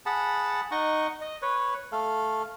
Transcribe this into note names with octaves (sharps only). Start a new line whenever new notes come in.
G#4 F#5 A5 B5
D#4 D#5 F#5 C#6
D#5
B4 C#5
A3 A4 F5